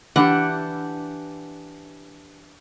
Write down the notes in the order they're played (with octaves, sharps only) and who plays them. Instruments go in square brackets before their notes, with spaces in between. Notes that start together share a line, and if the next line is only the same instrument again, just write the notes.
[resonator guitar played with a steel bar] E3 D4 G4 [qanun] F#5